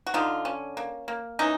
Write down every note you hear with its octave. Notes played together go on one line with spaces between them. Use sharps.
F#4
D3 D#4 F4
C#4
A#3
A#3
E3 C#4 D#4